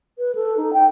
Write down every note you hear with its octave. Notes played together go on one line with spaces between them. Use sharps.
B4
A4
D#4
G5